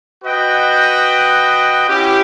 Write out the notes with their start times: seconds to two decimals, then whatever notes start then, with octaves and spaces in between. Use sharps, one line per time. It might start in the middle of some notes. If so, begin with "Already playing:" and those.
0.23 F#4 B4 D#5 G5
1.87 C#4 E4 G4